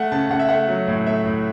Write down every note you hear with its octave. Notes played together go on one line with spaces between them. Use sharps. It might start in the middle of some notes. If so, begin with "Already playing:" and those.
Already playing: A3 F#5
C#3 A5
C#3 F#5
E5
A3 F#5
F#3
A2
A3 E5
A2